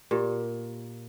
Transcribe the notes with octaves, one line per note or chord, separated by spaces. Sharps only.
A#2 G4